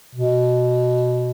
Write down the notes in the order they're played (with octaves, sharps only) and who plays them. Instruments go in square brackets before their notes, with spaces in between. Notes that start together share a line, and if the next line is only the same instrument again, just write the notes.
[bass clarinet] B2